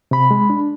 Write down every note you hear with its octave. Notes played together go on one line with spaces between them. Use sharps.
C3 B5
G#3
D4